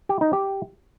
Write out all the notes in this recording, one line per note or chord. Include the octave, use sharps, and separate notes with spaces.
G4
D#4
G4